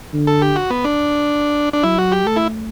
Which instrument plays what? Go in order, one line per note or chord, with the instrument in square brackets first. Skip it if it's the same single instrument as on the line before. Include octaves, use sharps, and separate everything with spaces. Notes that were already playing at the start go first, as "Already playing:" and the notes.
[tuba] D3
[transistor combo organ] A4
G4
F#4
B3
D4
D4
[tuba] F#3 [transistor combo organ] E4
[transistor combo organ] F#4
G4
[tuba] A3 [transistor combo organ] A4
[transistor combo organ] E4